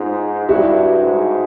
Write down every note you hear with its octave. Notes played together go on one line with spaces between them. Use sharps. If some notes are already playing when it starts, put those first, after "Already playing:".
Already playing: G#2 D#4 F4
G2 E4 F#4
G#2